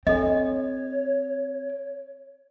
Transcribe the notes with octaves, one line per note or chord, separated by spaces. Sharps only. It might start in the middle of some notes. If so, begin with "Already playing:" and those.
C4 D4 A4 C#5 D#5